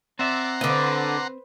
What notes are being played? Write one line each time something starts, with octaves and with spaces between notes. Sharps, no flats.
C4 D5 E5 F#5 A#5 C6
D3 B4 C5 D#5